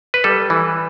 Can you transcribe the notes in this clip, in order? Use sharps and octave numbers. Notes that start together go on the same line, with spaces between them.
B4
G3 A4
E3